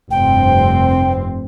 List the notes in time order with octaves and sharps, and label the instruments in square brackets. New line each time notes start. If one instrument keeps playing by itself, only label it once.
[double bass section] F1 G2 C4 [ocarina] G5